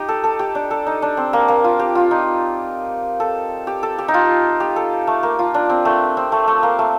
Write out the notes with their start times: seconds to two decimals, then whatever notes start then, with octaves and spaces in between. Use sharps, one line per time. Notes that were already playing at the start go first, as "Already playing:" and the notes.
Already playing: D#4 G4
0.09 A4
0.24 A4
0.39 G4
0.55 D4
0.71 A4
0.86 D#4
1.02 D4
1.17 C4
1.33 A#3
1.48 A#3
1.64 F4
1.79 G4
1.95 F4
2.11 D#4
3.20 A4
3.67 G4
3.83 A4
3.98 G4
4.08 D#4
4.14 F4
4.60 G4
4.76 A4
5.07 A3
5.23 A#3
5.39 F4
5.54 D4
5.69 C4
5.85 A3
6.17 C4
6.32 A3
6.48 A3
6.63 A#3
6.79 A3